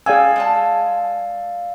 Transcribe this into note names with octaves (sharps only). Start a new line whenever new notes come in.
C#4 G#4 D5 F5 G5 G#5 E6
G#3 F#5 A5